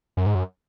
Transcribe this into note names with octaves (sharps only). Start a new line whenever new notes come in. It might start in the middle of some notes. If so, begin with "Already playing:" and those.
F#2
G#2
F#2